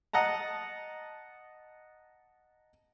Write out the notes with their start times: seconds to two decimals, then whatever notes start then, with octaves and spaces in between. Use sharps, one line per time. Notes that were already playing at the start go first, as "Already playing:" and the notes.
0.13 D#5 F#5 A5 A#5